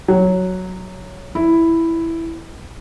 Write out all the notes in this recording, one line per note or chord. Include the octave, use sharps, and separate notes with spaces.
F#3
E4